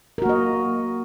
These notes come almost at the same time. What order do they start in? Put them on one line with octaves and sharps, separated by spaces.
A#4 F#4 A#3 D#5